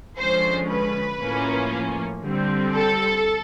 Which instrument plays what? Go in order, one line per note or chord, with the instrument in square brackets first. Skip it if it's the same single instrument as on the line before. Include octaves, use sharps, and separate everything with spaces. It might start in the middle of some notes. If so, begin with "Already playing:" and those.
[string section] D3 F3 G#3 C#4 C5
B4
A2 F3 A#3 C#4
D3 G3 C4
A4